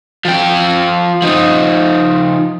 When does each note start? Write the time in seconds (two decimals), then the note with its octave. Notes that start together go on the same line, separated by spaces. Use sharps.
0.25 F3 G5
1.22 F3 D#4